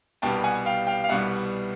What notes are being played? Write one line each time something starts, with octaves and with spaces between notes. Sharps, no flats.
C2 B2 G3 B3 G5 A5
F#5 G#5
F5 G5
F5 G5
F5
C2 B2 G3 B3 E5 F#5